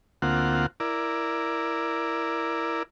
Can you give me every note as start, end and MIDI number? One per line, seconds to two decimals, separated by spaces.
0.22 0.66 38
0.22 0.66 58
0.22 0.66 60
0.22 0.66 65
0.22 0.66 78
0.80 2.83 64
0.80 2.83 70
0.80 2.83 74